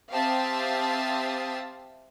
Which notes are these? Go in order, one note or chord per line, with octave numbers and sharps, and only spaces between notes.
C4 G4 E5 F5 A5 D#6